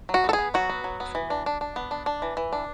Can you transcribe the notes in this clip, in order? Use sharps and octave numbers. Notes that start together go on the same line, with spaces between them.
F#3
F#4
B3 A4
G#4
B3
F#3 F#4
B3
F#3
B3
E3
D4
D4
D4
B3
D4
D4
E3
E3
D4